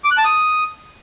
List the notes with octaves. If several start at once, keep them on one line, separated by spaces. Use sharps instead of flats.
D6
F#6
A5
D#6